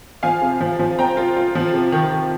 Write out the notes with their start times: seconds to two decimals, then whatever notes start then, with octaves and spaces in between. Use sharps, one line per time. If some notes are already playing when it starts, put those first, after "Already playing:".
0.23 F3 F5 G#5
0.42 C3
0.61 F3
0.79 F3
0.99 C4 G5 A#5
1.17 F4
1.36 F4
1.55 F3
1.74 C3
1.92 D#3
2.11 D#3